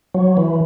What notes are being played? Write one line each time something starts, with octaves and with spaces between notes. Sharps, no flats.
F#3
E3